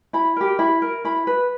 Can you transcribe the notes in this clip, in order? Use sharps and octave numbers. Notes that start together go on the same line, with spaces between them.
E4 B5
G4 A#4
E4 B5
A#4
E4 B5
B4